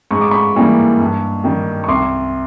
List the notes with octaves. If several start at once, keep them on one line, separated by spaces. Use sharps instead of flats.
G#2 C#6
D6
B5 C#6
E3 G3 A#3
G2
D#3 G3
C#6
C2 C6 D6